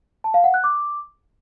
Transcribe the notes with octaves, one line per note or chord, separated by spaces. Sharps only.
A5
F5
F#5
F#6
D6